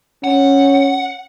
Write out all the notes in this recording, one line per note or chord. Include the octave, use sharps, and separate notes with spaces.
C#4 F#5